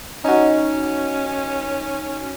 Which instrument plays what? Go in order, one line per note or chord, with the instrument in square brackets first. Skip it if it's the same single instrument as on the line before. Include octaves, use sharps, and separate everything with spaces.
[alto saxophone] C#4 [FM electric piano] D#4 F#4